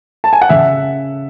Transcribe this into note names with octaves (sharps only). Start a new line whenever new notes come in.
A5
G#5
F#5
C#3 E5